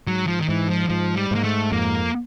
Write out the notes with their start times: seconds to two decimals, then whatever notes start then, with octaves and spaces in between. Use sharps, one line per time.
0.07 G#2 F#3
0.27 F3
0.41 D#3
0.49 G#2 E3
0.69 F3
0.89 G#2 F3
1.16 G3
1.31 G#2 A#3
1.44 A3
1.72 F2 A#3